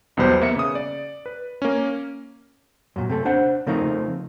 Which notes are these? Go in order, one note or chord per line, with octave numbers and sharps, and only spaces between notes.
B1 E2 B2 G3 B4 C5
A#3 B3 E5 C#7
C#3 D#6
D5
B4
A#3 C#4
F#2 A#2
C3 A3 A4
D4 C5 F#5
C#3 F3 A3 A#3 C4 D#4